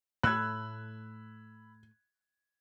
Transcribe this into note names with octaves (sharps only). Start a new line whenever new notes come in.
A2 A3 B5 E6 F#6 G#6